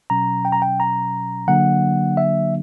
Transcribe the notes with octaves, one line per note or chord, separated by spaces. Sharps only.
B2 F#3 C#4 A#5
G5
A#5
G5
A#5
D3 F#3 A#3 D4 F#5
E5